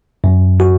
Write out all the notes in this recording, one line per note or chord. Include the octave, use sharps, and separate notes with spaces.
F#2
F#4